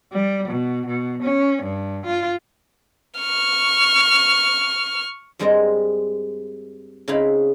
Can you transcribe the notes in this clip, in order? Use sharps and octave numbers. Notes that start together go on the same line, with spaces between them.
G3
B2
B2
C#4
G2
F4
C#6 F6
G2 G3 G#3 C4 A#4 D#5
C#3 C4 D#4 E4 F5 B5